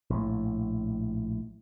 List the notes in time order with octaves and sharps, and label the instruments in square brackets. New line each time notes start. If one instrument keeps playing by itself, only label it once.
[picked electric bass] A#1 A2